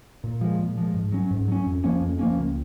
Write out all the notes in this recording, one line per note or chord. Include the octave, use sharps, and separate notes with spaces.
A#2
F3 G#3
A#2
F3 G#3
G#2
F#3 C#4
G#2
F#3 C#4
F2
F3 A#3 C#4
F2
F3 A#3 C#4
C#2